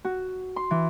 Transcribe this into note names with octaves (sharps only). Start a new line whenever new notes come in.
F#4
C6
E3